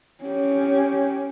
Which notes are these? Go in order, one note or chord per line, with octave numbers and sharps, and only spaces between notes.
C#4 G4